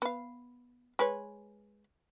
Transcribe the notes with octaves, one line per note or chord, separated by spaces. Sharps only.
B3 F5
G#3 B4 C#5